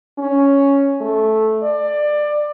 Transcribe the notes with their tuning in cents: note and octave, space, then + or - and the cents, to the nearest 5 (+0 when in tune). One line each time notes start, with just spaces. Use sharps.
C#4 +5
A3 -10
D5 +20